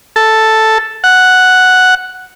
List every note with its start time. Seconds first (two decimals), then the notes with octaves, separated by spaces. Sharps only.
0.16 A4
1.04 F#5